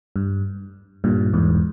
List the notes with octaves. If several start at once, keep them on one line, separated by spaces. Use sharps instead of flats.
G2
G2 A#2
E2 G#2